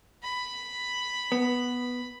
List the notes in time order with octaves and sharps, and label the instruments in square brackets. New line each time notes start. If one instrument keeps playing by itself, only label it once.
[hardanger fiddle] B5
[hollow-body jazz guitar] B3